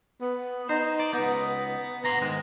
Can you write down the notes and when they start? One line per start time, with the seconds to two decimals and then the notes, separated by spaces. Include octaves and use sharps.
0.21 B3
0.69 D#4 C5
1.00 D5
1.13 C#2 B3 D#4
2.04 D2 A#5 C6
2.22 G#2 D#3 G#3